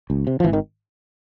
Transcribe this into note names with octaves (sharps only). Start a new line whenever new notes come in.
C#2
C3
F3
G#1 E3
D#3